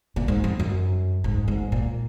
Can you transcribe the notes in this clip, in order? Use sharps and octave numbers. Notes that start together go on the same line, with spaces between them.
A#2
G#2
F2
F#2
G#2
G#2
A#2